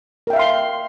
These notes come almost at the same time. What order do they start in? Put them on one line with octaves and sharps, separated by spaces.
A#4 G5 E5 F5 C6